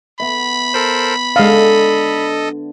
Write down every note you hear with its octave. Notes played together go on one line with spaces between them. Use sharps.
B3 E5 B5
A4 A#4 C5
D3 G#3 A4 D#5 F5